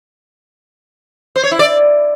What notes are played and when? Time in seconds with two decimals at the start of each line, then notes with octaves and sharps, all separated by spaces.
1.36 C5
1.43 C#5
1.51 E4
1.59 D5